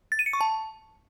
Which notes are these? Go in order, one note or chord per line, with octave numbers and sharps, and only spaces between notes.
A6
D#7
C#7
C#6
A5